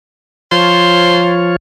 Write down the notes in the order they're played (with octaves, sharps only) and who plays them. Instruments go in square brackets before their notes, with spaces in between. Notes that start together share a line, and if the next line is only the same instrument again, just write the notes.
[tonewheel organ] F3 F4 C#5 [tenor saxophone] C5